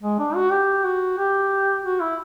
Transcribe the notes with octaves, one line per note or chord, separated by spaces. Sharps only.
G#3
D4
F#4
G4
F#4
G4
F#4
E4